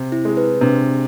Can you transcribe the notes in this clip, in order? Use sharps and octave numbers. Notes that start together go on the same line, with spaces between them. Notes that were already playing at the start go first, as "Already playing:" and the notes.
Already playing: C3
E4
G#3
B4
C3 D4